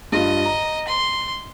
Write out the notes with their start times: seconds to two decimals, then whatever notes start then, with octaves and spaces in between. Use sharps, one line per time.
0.12 G2 F4 D#5
0.45 A#5
0.88 C6